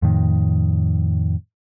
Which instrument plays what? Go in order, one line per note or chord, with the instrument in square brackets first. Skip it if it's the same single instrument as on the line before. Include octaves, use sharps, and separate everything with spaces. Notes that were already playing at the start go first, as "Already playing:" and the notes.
[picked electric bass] F2 A2 D#3